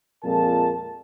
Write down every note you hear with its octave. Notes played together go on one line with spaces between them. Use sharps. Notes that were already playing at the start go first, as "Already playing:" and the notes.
F2 A#2 G#3 A#4 A5